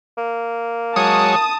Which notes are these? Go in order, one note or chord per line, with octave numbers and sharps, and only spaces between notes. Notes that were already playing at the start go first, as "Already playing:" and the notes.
A#3
F#3 G#3 C#5 A5 D#6